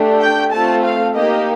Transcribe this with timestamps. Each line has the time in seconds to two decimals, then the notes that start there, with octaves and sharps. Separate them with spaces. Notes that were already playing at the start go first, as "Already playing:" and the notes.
Already playing: A3 D4 G4
0.21 G5
0.52 A3 C4 F4 A4 A5
0.84 F5
1.15 A#3 D#4 G4 D#5